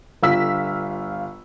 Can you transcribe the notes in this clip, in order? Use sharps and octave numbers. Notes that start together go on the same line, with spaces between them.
G1 F4 E6 B6